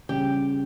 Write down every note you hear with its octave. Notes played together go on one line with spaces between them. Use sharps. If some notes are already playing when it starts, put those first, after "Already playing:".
C#3 G3 C#4 G4